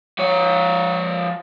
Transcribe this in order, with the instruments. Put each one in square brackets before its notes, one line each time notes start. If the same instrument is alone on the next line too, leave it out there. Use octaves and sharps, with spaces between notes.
[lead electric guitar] F3 C#5